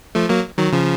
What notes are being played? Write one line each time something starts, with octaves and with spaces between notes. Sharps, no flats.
F3 A3
F#3 A#3
D#3 F#3
C#3 F3